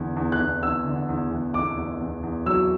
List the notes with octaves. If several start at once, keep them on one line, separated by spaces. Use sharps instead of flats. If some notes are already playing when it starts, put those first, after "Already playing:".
Already playing: E2 D3
E2
F#6
E2
E2 E6
D3
E2
E2
E2 D6
E2
E2
E2
F#3 E6